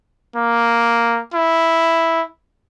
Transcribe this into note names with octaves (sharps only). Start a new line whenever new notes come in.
A#3
E4